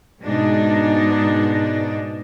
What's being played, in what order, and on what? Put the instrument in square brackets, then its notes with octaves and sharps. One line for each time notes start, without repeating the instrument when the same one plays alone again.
[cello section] G#2 B2 G#3 D4 D#4